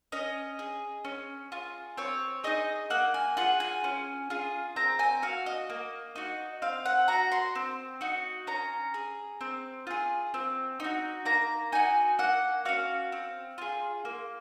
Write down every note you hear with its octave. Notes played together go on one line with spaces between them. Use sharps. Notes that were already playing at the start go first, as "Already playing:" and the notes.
C#4 D#5
G#4
C#4
F4 G#4
C4 C#5
D#4 G#4 D#5
A#3 F#5
G#5
F4 G#4 F#5
G#5
C#4
F4 G#4
C4 A#5
G#5
F#4 F5
D#5
A#3
D#4 F#4
C4 F5
F#5
F#4 A#5
C6
C4
D#4 F#4
C#4 A#5
G#4
C4
F4 G#4
C4
D#4 F#4
A#3 A#5
D#4 F#4 G#5
A#3 F#5
C#4 F#4 F5
C4
F4 G#4
A#3